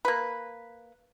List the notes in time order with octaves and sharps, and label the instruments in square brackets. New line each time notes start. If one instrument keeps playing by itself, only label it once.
[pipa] A#3 B4